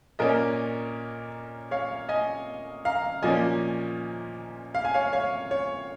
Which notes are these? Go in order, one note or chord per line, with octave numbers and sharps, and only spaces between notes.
A#2 A#3 C#4 A#4 D#5
C#5 F5
D#5 G#5
F5 A#5
A#2 F3 A#3 C#4 D#5 G#5
F5
G#5
C#5 F5
C#5 F5
C#5